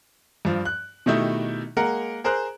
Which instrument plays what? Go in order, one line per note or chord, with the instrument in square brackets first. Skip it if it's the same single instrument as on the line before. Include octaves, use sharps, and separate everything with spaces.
[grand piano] G2 F3
F#6
B2 D#3 A3 D#4 E4 G4
G#3 A#3 A#4 F#5
G#4 A#4 C5 A#5 F#6